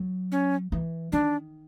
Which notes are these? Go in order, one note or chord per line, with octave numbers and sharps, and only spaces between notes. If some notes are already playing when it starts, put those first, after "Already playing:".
Already playing: F#3
C#4
E3
D#3 D4